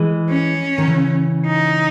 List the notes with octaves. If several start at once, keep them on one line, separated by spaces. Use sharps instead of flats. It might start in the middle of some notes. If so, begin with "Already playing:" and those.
Already playing: E3 G#3
C#4
D#3
C#3 E3
D#4